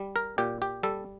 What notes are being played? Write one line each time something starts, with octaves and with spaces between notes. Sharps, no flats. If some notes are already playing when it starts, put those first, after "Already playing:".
Already playing: G3
A#4
A#2 G4
G4
G3 A4